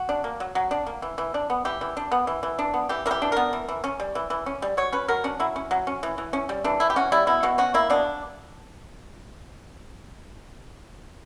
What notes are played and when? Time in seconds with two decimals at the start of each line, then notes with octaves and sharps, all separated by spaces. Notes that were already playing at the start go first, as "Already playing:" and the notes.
Already playing: F#4
0.09 D4
0.24 A#3
0.40 F#3
0.55 F#3
0.71 D4
0.87 A#3
1.02 E3
1.18 E3
1.34 D4
1.50 B3
1.65 E3 G4
1.81 E3
1.97 D4
2.12 B3
2.27 E3
2.43 E3
2.59 D4
2.74 B3
2.89 E3 G4
3.06 E3 A#4
3.11 G4
3.22 D4
3.32 B3 A#4
3.53 E3
3.69 E3
3.84 C#4
4.00 G3
4.15 E3
4.30 E3
4.46 C#4
4.62 G3
4.77 F#3 C#5
4.92 C#4 B4
5.08 F#3 A#4
5.24 C#4 D4
5.40 F#3 E4
5.56 C#4
5.71 F#3
5.87 C#4
6.03 E3
6.18 E3
6.33 C#4
6.49 G3
6.64 E3 D4
6.80 E3 E4
6.90 G4
6.96 C#4 F#4
7.12 G3 E4
7.27 B2 E4
7.43 B2 F#4
7.58 C#4 F#4
7.74 A#3 E4
7.90 B2 D4